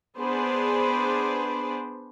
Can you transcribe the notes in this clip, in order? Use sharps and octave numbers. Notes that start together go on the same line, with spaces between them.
B3 D4 G#4 B4 C5 D5